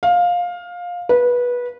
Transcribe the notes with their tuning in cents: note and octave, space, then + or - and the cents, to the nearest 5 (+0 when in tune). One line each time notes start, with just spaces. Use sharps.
F5 +15
B4 -20